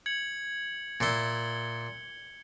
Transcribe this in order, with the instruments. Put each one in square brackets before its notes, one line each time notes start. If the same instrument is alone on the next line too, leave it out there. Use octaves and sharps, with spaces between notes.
[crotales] G#6 C#7 F#7
[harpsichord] A#2 E4 [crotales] C#7 G7